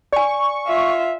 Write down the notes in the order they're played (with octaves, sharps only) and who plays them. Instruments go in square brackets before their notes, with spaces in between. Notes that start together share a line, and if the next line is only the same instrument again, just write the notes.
[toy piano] D5 G#5 [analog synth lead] C#6
[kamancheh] F4 E5